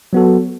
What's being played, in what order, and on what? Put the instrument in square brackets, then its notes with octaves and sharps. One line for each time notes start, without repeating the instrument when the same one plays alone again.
[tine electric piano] F#3 B3 F#4 A4